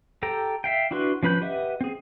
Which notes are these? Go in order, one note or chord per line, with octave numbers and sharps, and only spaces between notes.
G4 A4 G5 A#5
E5 F5 G5
D4 E4 F#4 B4 C6
F3 C#4 B4 B5 G6
G4 B4 D#5 E5 F#5
C4 G#4